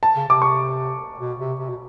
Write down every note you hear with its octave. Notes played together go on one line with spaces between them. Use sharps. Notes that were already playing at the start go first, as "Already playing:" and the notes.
A5
C#3
C3 D6
C#6
B2
C3
C3
B2